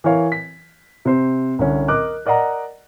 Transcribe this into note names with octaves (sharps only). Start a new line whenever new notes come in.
E3 E4 A#4 C#5 F5
B6
C3 C5
C2 D3 C#4
A#4 D#5 D6 F#6
A#4 D5 D#5 F#5 A#5